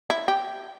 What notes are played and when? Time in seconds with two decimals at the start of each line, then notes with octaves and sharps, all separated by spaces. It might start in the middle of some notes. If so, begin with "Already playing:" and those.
0.10 E4
0.28 G4